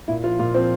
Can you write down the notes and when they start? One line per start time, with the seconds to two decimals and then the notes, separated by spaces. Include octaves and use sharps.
0.08 A#2 E4
0.24 F3 F4
0.39 A#2 F4
0.54 F3 C4